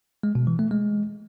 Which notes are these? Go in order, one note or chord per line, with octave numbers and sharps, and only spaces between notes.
G#3
B2
E3
A3
G#3